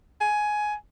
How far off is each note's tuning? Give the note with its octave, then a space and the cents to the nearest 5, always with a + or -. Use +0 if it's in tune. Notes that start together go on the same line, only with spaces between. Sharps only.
G#5 +15